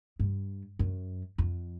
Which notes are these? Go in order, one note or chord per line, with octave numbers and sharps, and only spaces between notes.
G2
F#2
F2